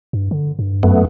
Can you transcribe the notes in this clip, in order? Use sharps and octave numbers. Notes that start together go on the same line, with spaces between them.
G2
D3
G2
F#2 A3 B3